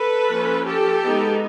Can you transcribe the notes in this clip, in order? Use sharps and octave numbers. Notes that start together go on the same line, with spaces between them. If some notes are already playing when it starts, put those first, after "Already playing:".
Already playing: A4 B4
F3 A#3 C#4
G4 A4
G#3 B3 D#4